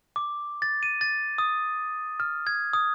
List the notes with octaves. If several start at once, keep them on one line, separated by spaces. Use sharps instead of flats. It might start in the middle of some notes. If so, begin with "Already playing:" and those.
D6
A6
D#7
A6
D#6
F6
G#6
D#6